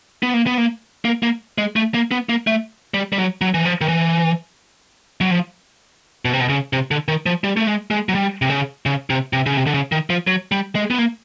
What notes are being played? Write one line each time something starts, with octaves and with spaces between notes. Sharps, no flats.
B3
A#3
B3
A#3
A#3
A#3
G#3
A3
A#3
B3
A#3
A3
G3
G3
F#3
F#3
E3
F3
D#3
E3
F#3
F3
B2
C3
B2
C#3
C3
D3
D#3
F3
G3
A3
G#3
G#3
F#3
G3
C3
C#3
C#3
C3
C3
C#3
C3
D3
C#3
D#3
F3
F#3
G3
G#3
B3
A#3